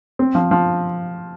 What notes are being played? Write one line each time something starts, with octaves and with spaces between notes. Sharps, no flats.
C4
F3
F3